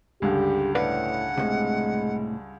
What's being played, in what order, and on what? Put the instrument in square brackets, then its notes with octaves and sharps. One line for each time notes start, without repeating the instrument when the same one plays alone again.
[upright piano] C#2 G2 D3 [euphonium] G4
[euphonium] A2 [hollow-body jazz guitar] B4 D5 F5 [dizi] F#5
[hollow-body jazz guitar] A2 C3 [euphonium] G#3